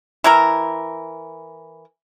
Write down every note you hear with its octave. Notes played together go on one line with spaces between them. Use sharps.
E3 E4 A#4